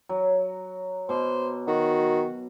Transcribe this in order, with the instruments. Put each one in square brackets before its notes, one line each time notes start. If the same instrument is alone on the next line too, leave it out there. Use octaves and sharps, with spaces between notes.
[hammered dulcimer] F#3
[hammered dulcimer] B2 D6 [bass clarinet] C5
[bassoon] D#3 [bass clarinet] F#4